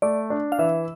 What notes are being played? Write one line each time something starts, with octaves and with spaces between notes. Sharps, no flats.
A3 D5
D4
F5
E3 E5